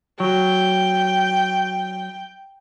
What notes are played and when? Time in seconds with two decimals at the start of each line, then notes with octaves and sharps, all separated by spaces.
0.20 F#3 G5